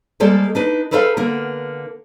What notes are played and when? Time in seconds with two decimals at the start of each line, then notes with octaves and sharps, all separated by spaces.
0.20 G3 G#3 A#3 A4 C5 D5
0.55 D4 D#4 B4
0.91 G#4 A4 B4 C5 E5 F5
1.17 D3 A#3 B3 A#4